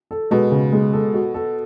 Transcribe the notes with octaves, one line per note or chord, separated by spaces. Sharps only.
A4
B2 G#3
C#3
G#3
A4
F#4
A4